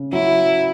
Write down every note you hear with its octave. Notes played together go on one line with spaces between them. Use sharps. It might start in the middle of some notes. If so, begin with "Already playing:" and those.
Already playing: C#3
F#3 E4